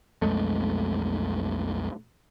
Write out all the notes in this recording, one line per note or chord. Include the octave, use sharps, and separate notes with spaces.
B1 F2 G#3 A3